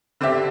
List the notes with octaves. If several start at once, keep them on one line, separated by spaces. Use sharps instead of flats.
D3 C4 G4 E5